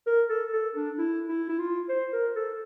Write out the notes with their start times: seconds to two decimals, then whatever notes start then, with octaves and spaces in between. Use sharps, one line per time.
0.07 A#4
0.29 A4
0.53 A4
0.75 D4
0.98 E4
1.29 E4
1.49 E4
1.59 F4
1.89 C5
2.13 A#4
2.36 A4